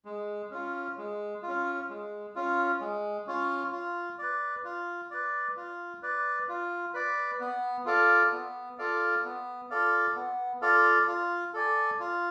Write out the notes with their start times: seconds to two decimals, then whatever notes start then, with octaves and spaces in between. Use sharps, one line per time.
0.05 G#3
0.51 C#4 F4
0.97 G#3
1.43 F4
1.48 C#4
1.90 G#3
2.35 C#4 F4
2.81 G#3
3.27 C#4 F4
3.72 F4
4.19 B4 D5
4.64 F4
5.11 B4 D5
5.57 F4
6.02 B4 D5
6.49 F4
6.94 B4 D5
7.40 B3
7.86 F4 A4 D5 F5
8.32 B3
8.78 F4 A4 D5 F5
9.24 B3
9.70 F4 A4 D5 F5
10.16 B3
10.62 F4 A4 D5 F5
11.08 F4
11.54 A4 D5 G#5
12.00 F4